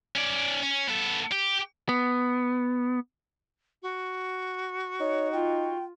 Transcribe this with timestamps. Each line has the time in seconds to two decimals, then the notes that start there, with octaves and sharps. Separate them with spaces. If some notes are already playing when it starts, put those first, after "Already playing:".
0.15 C#4 D5
0.63 C#4
0.88 B3 A4
1.32 G4
1.89 B3
3.83 F#4
5.00 D#4 C#5
5.32 F4 G5